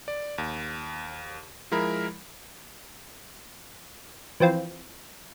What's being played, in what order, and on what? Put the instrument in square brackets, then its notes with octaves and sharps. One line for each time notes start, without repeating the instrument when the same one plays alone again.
[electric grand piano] D5
D#2
F3 G#3 E4 A#4 B5
[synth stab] E3 F3 C4 F4